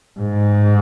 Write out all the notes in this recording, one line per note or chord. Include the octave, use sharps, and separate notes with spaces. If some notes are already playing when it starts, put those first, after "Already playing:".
G#2